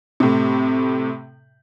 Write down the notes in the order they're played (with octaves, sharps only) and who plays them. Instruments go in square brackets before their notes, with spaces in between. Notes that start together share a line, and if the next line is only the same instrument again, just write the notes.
[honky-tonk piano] A2 C3